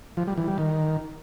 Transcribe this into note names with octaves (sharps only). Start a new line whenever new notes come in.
F3
G3
E3
G3
D#3